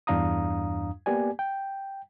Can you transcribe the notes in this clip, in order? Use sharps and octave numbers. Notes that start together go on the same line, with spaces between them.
E2 G2 D4 F5 A#5 D#6
A#3 B3 G4 D5 G#5
G5